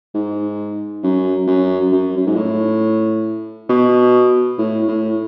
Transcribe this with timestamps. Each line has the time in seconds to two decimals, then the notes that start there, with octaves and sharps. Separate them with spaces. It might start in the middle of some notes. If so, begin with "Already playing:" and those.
0.15 G#2
1.03 F#2
1.47 F#2
1.92 F#2
2.17 F#2
2.27 G#2
2.36 A2
3.70 B2
4.58 A2
4.88 A2